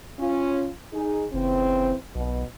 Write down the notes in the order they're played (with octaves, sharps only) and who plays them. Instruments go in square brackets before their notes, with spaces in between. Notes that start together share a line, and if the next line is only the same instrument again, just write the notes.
[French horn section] C#4 F4
D#4 G#4
[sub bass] F#1 [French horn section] C#3 E3 C4
[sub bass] B1 [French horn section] B2